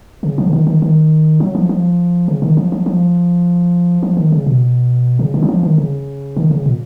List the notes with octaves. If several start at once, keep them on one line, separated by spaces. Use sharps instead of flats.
C#3
F3
C#3
D#3
D#3
D#3
F#3
F3
F3
C#3
D#3
F3
F3
F3
F3
D#3
C#3
B2
C#3
D#3
F#3
F3
D#3
C#3
D#3
C#3
A#2